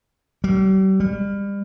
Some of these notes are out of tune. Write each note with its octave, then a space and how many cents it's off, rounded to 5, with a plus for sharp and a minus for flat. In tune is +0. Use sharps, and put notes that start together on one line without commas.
G3 -40
G3 +35